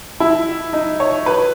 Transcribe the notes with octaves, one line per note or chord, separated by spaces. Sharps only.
E4
D#4
C#5
B4